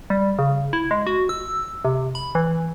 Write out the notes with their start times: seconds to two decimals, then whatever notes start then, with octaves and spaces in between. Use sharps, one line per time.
0.10 G3
0.39 C#3
0.73 E4
0.91 G#3
1.07 F#4
1.29 E6
1.85 C3
2.15 B5
2.35 E3